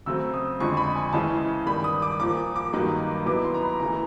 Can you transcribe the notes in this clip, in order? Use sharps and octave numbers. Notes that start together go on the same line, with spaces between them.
C#3 F#3 A3 C4 E6
D#6
F2 D3 F3 G#3 C#6
B5
G#5
C#3 E3 G#3 C#4 E4 A5
G2 D#3 G3 B5
D#6
D6
A#2 F3 A#3 D6
D6
G2 D#3 F#3 A#3 D#4
B2 F#3 B3 E4 D6
C6
A#5
B5
F#2 C#3 E3 A3 A#5